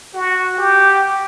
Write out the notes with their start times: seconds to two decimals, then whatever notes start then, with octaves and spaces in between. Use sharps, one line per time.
0.14 F#4
0.58 G4